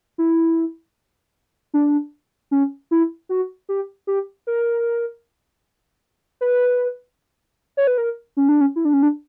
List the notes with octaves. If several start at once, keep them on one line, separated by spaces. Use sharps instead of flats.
E4
D4
C#4
E4
F#4
G4
G4
A#4
B4
C#5
B4
A#4
C#4
D4
C#4
E4
D4
C#4
D4